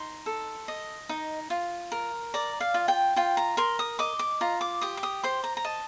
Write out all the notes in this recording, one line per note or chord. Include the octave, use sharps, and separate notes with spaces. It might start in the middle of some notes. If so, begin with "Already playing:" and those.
Already playing: D#4 C6
A4
D#5
D#4
F4
A#4
D5 A#5
F5
F4
G5
F4 G5
A#5
A#4 C6
D#6
D#5 D6
D6
F4 A#5
D6
G4 D#6
D6
D#6
C5 C6
A#5
A#5
D#5 A5